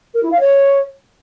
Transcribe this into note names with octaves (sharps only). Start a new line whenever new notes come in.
A#4
E4
F5
C#5